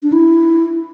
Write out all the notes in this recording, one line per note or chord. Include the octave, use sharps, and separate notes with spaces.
D4
E4